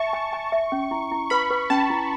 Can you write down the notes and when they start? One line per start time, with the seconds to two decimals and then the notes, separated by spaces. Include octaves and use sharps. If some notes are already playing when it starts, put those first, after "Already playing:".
Already playing: E5 A5 C#6
0.13 G#5
0.33 G#5
0.52 E5
0.72 C#4
0.91 E4
1.11 E4
1.30 B4 B5
1.51 B4
1.70 C#4 A5
1.90 E4